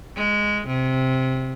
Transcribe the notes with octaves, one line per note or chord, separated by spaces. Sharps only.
G#3
C3